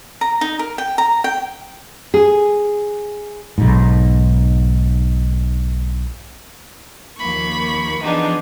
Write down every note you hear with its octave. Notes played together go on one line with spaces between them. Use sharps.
A#5
D#4
A#4
G5
A#5
G5
G#4
B1 G#2
D#2 F3 A#3 B5 C#6
E3 F3 B3 D4 D#4 G#4